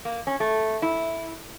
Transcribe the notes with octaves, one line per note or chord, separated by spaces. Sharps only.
A#3
C#4
A3
E4